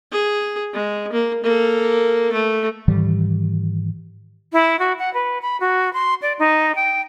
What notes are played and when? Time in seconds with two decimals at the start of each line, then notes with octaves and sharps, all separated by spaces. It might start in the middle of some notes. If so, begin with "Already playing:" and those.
0.12 G#4
0.74 G#3
1.13 A#3
1.44 A#3 A4
2.33 A3
2.88 G#2 D#3 E3 G3
4.53 E4
4.79 F#4
4.99 F#5
5.14 B4
5.42 B5
5.60 F#4
5.93 C6
6.22 D5
6.39 D#4
6.75 G5